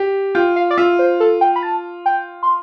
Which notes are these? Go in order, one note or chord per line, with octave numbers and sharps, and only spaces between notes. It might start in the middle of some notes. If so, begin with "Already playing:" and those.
Already playing: G4
F4 G5
F5
D5
F4 E5
C5
A4
G5
B5
A5
G5
C6